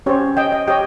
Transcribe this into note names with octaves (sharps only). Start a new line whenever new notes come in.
C#4 G4 C5 C#5
D#5 G5
D#5
G4 C#5 D#5 G5